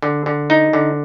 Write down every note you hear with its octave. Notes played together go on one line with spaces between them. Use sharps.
D3
D3
D#4
D3